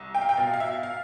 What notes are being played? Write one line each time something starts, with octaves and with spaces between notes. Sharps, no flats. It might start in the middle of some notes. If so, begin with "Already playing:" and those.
Already playing: C2
G5
F5
G5
B2 F5
F5
E5
F5